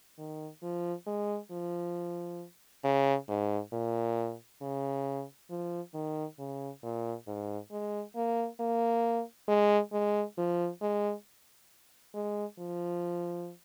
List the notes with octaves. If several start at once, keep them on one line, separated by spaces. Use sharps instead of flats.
D#3
F3
G#3
F3
C#3
G#2
A#2
C#3
F3
D#3
C#3
A#2
G#2
G#3
A#3
A#3
G#3
G#3
F3
G#3
G#3
F3